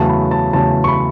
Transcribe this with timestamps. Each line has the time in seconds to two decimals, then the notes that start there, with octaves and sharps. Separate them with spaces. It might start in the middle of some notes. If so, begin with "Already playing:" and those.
Already playing: E2 C#3 F#3 A3 A5
0.09 B5
0.31 A5
0.53 E2 C#3 F#3 A3 A5
0.84 C#6
0.88 B5